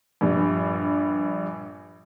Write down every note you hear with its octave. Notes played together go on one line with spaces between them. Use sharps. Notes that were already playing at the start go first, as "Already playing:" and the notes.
A#1 G2 G3